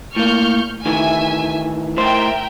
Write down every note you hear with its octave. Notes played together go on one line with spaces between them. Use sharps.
A2 A#3 C#6 F6 G6
D#3 E3 A3 E5 G#5
A2 A#4 C5 E5 G5